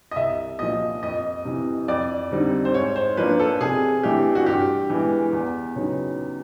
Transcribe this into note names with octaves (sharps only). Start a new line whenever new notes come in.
D#5
C2 E5
A#2 F3 D#5
F2 D#5
C3 E3
F2 D5
D3 G3 C4 D#4
C5
G#2 C#5
C5
F3 A#3 D4 B4
A4
C3 G#4
E3 A3 D4 G4
F#4
G2 G4
E3 G#3 B3
E2
C#3 F#3 B3 D#4